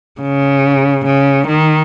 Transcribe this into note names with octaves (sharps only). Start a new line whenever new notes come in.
C#3
C#3
D#3